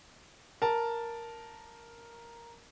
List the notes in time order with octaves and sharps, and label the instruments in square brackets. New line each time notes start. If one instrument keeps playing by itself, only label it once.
[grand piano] A#4 A5